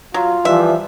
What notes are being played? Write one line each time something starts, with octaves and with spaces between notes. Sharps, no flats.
F#3 F4
E3 F3 G3 E5